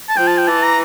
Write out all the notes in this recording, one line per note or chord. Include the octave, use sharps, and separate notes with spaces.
A5
F3 G5
A5
G5
E3 A5
A#5